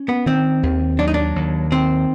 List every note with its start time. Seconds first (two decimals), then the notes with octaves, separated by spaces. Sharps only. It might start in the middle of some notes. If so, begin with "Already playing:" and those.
Already playing: C#4
0.09 B3
0.26 D#3 C4
0.63 D#2
0.99 F#3 D4
1.08 D#4
1.14 D4
1.36 D#2
1.72 D#3 C4